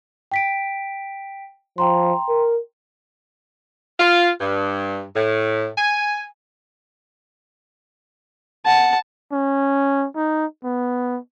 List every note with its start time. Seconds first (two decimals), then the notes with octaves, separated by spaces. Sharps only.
0.32 G5 B6 D7
1.78 F3 G5 A#5 C6
2.29 A#4
4.00 F4
4.40 G2
5.16 A2
5.78 G#5
8.66 F#5 A5
9.33 C#4
10.16 D#4
10.64 B3